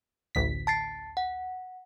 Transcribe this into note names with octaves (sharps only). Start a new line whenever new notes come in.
A1 D2 B6
A5 A6 C7
F#5